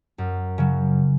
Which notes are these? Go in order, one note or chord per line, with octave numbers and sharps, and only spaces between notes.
F#2
C#3 F#3